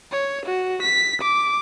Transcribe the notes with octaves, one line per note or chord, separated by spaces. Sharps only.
C#5
F#4
B6
D6